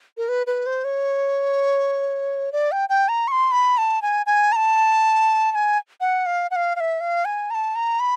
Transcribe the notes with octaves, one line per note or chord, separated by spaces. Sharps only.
A#4
B4
B4
C5
C#5
D5
G5
G5
A#5
C#6
C6
B5
A5
G#5
G#5
A#5
A5
A5
G#5
F#5
F5
F#5
F5
F5
E5
F5
G#5
A#5
A5
A#5
B5